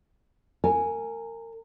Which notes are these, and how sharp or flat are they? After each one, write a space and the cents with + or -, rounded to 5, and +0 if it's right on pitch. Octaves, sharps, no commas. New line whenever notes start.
A#4 -30 G#5 +0